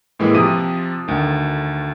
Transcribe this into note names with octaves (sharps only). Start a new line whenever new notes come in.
A2 E3 G#3 A#3 E4
C3 F3 D6 D#6 D#7
D2 D#3